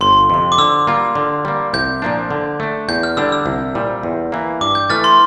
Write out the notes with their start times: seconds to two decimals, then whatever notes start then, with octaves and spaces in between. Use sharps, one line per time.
0.01 G1 C6
0.30 F2 C3
0.52 D6
0.58 D3 E6
0.87 G3 A#3 F4
1.15 D3
1.45 G3 A#3
1.73 C2 G6
2.02 A#2 F3 A#3 D4
2.31 D3
2.60 A3 D4
2.88 E2 G6
3.03 F6
3.17 D3 G3 D4 E6
3.32 E6
3.46 C2
3.75 A#2 G3
4.03 E2
4.32 E3 A#3
4.61 G2 D6
4.75 G6
4.90 E3 A3 F6 A6
5.04 C6